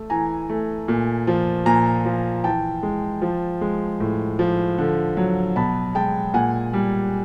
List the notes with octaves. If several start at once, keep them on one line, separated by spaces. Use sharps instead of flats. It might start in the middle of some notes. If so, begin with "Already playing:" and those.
Already playing: A3
E3 G#5 A#5
A3
A#2
F3
A#2 G#5 A#5
F3
E3 G5 A5
G#3
F3
G#3
A2
F3
D3
F#3
B2 A5 B5
G#3 G5 A5
A#2 F#5 G#5
G3